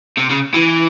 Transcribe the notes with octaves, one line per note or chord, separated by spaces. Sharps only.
C3
C#3
E3